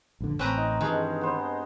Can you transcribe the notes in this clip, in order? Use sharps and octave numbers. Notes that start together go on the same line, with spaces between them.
A#1 G2 D3
A1 C4 C#4 B4 A#5
D#4
G2 D#3 E3 G#3 G#4
B3 C5